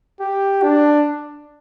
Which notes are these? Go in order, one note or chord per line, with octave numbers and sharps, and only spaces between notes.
G4
D4